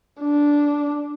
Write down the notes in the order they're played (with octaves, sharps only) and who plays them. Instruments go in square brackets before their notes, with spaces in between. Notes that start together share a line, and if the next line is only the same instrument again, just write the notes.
[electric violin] D4